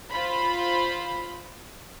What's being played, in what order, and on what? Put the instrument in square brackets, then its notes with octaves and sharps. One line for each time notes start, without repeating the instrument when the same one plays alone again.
[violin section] F4 C5 B5